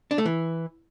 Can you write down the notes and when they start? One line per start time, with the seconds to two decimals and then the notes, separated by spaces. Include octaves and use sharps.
0.11 D4
0.18 A3
0.25 E3